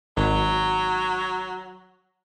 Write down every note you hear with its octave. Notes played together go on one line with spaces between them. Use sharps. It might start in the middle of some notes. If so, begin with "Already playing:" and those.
G#1 F#3